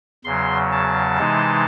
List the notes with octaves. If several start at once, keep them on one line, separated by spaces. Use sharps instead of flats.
E2 C#3 F#3 C6
A5
C3 E3 G#3 D#4